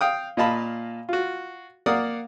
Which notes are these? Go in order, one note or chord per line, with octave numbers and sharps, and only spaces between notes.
F5 G5 D#6
A#2 D#5 F5 A5 B5
F4 F#4
A#3 A#4 D5 F5 F#5 D#6